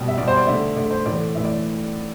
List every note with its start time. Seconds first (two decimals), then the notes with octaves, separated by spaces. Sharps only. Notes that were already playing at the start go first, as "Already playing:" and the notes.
Already playing: B2 G3
0.08 E5
0.18 B2 G3 D5
0.28 C5
0.37 D5
0.47 D3 A3 E5
0.77 D3 A3 D5
0.91 C5
1.06 A2 E3 A3 D5
1.35 A2 E3 A3 E5
1.45 D5